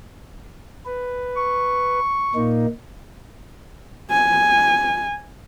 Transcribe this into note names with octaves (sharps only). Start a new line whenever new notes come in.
B4
C#6
A#2 A#3 D#4
G#5